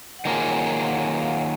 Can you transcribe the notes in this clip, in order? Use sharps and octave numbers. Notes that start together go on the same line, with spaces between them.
F#5
D#3 F#3 A#3 F4 G#4 G#5
F#5
F5
F#5
F#5
F5